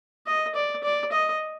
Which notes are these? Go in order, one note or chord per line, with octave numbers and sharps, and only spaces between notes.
D#5
D5
D5
D#5